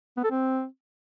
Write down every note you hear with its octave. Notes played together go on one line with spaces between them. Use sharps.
B3
A4
C4